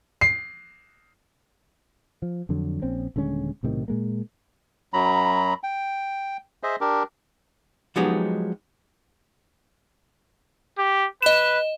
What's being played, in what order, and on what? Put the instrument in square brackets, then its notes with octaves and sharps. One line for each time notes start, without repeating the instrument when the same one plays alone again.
[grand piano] C7
[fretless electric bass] F3
F2 D3 F#3
A#1 C4 C#4
D#1 D3 G#3 C#4
B1 A2 C3 D#3
A#2 G#3 A#3
[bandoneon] F#2 F#3 A#5 B5
G5
G#4 C5 D#5 E5
D4 G4 A#4
[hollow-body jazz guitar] F3 F#3 G#3 B3 D#4 G4
[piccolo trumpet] G4
[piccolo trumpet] B4 [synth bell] D#5 E7